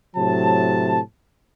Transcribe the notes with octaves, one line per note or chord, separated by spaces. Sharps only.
A2 C3 F#3 A5